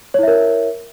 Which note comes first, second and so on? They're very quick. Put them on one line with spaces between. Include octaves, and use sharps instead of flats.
C#5 E4 E5 A#4